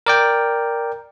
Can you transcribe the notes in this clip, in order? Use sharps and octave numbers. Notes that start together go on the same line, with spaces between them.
A#4 D5 G5